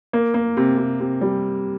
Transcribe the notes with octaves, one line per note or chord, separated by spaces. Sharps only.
A#3
A#3
C3
C3
C3
G3